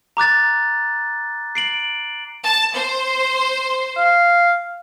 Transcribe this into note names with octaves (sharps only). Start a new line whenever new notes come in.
A#5 D6 F#6 A6
C7 D7 F#7
A5
C5
F5